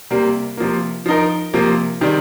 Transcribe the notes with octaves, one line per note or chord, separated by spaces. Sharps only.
C3 G3 A#3
C3 F3 A#3
F3 D#4 A#4
C3 F3 A#3
C3 D#3 G3